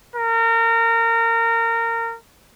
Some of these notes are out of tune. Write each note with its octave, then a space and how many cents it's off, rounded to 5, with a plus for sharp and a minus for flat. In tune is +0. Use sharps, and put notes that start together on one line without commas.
A#4 -25